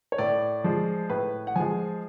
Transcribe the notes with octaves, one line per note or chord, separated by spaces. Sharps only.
C#5
A2 D5
F3 G#3
A2 B4
F#5
F3 G#3 G#5